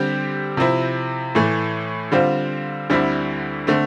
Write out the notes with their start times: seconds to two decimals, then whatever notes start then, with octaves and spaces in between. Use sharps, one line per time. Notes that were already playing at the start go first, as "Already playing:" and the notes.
Already playing: D3 G3 C4 G4
0.57 C3 F3 C4 E4
1.35 A2 E3 A3
2.12 D3 G3 C4 F4 C5
2.90 D2 D3 G3 C4 E4
3.67 D3 A3 C4